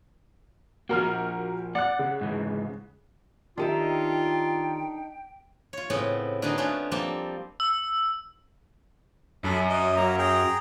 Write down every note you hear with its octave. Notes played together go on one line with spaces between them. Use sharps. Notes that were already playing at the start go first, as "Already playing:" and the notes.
F3 A#3 F#4 A#4 F6
D5 F#5 F#6
C#3
G#2 E3
D#3 D4 D#4 F4 G4 A4 E5 G5
F4 C#5
A2 C#3 B3 C4
D3 B3 D#4 F#4 G#4 B4
D3 A3 B3 C#4 F4
F3 G3 A#3 C4 C5 A5
E6
F#2 A4 B5
D#5
F#3 A#3 A#5
G#4 G5 A#5